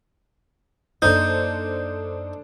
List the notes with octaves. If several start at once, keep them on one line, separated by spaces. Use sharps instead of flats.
F#2 A#3 D4 D#4 A4 C5 G6